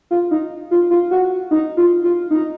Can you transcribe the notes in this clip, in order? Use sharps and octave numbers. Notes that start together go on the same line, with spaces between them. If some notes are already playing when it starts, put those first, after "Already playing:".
F4
D#4
F4
F4
F#4
D#4
F4
F4
D#4